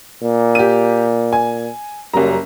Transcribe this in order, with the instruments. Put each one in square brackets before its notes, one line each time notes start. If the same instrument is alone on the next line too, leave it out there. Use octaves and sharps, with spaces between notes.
[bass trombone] A#2
[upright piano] G4 D#7
G#5
[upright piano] F#1 G3 A#5 [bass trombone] F#2